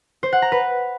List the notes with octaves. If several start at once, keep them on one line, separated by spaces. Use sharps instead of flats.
C5
F#5
A#5
B4